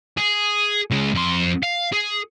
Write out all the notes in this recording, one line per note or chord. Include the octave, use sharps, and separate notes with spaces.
G#4
C#2 G#3
F2 C6
F5
G#4